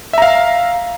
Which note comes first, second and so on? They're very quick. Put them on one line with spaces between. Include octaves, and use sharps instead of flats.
E5 A#5 F5